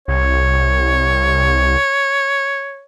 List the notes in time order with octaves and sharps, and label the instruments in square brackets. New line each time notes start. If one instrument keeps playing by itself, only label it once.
[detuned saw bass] C2 [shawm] C#5